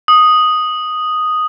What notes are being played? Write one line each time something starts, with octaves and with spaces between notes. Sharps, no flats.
D#6